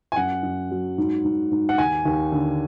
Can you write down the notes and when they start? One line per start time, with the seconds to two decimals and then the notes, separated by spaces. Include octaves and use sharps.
0.12 G#5
0.16 F#2 F#5
0.43 F#2
0.71 F#3
0.98 G#2
1.24 G#2
1.51 G#2
1.69 F#5
1.78 D#2 G#5
2.05 D#2
2.32 D3